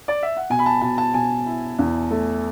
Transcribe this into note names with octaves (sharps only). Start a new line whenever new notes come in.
D5
E5
F#5
B2 G#5
B5
A5
B2 A5
A5
B2 G#5
E4
E2
A3